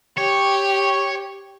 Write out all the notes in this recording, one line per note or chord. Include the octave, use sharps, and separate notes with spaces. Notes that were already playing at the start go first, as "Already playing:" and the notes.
G4 C#5